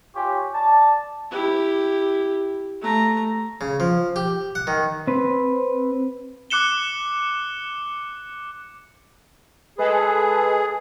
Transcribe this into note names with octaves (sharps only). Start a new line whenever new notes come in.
F4 G4 C#5 G#5 C#6
D5 A5
E4 G4
A3 A#5
C#3
F3
G4
F#5
D#3
C4 B4
D6 F#6 C#7 E7 G7
G#3 G#4 A4 B4